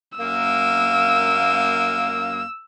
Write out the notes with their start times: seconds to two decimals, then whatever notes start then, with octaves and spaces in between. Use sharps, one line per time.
0.19 F#2 A#3 E6